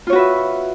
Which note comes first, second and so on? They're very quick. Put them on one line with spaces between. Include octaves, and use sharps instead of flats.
F4 C#5 F#4 B4 E5